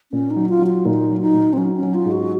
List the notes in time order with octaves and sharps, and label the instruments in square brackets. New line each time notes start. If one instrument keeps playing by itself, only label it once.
[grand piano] A#2 [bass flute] C#4
[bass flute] D#4
[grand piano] F#3
[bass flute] F4
[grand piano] F#3
[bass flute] F4
[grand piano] A#2 [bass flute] D#4
[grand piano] F#3
[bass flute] D#4
[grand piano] A#2
[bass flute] C4
[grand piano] F#3 [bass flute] C#4
[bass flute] C#4
[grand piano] F#3
[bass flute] F4
[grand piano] G#2
[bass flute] F#4